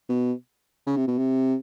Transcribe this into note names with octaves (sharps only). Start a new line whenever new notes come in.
B2
C#3
C3
B2
C3